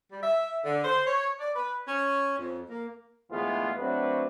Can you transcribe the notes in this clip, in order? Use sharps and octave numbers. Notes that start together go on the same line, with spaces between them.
G3
E5
D3
C5
C#5
D5
B4
C#4
F2
A#3
D2 E3 G#3 A3 B3 F4
F#3 A3 C4 D4 F#4 B4